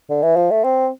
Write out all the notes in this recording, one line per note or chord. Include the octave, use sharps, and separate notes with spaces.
D3
E3
F3
A3
C4